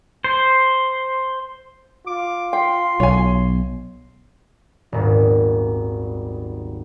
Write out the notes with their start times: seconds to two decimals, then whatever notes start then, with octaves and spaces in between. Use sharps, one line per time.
0.24 C5
2.07 F4 D6
2.53 G5 C6
3.00 B1 C#5 G#5
4.92 D#1 G#1